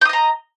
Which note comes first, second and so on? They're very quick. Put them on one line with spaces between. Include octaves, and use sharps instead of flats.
G6 D#6 D#5 A#5